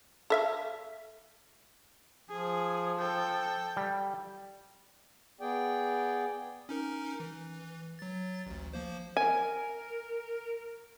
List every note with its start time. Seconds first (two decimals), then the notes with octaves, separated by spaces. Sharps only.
0.30 A4 E5 F5
2.29 F3 G#4
2.99 A4 G5
3.77 G3
5.41 B3 G#4 D5 G5
6.69 C#4 D#4 A#4
7.20 E3
7.99 F#3 A6
8.46 A1 D2
8.73 F3 A#3 C5
9.17 A#4 G#5